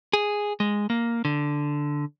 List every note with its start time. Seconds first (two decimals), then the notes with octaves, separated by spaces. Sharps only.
0.13 G#4
0.60 G#3
0.90 A#3
1.25 D3